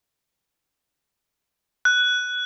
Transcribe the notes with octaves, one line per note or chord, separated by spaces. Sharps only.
F#6